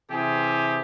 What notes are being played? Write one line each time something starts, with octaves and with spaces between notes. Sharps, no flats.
C3 E3 G4 G#4